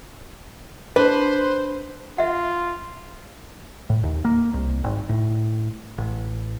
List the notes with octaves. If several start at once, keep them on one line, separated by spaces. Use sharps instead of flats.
D4 B4 C5
F4 E5 F#5
A2
D#2
A#3
C2
G#1
A2
A1